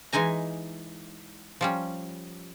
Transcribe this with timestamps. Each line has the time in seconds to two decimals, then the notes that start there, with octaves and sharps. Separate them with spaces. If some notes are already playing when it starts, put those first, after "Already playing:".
0.13 E3 G#3 D#4 G#5 A#5
1.61 F3 G3 C#4